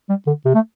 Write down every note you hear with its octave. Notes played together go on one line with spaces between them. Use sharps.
G3
D3
C3
A3